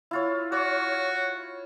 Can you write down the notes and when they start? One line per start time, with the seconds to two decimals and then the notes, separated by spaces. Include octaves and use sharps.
0.11 E4 F4 C#5
0.52 F#4 C#5